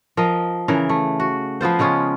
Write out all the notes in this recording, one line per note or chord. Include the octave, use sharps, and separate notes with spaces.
F3 A#4 D#5
C#3 E3 A#4
A3
F#4
F3 B3 F4 C5
C#3 G#3 C#4 F4